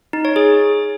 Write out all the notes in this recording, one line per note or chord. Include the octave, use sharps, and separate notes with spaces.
D#4
C#5
G#4